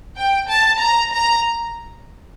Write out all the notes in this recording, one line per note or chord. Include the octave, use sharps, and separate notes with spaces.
G5
A5
A#5
A#5